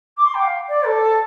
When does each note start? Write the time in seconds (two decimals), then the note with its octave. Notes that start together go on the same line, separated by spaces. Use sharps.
0.17 D6
0.24 C6
0.34 G5
0.42 F5
0.68 D5
0.85 A4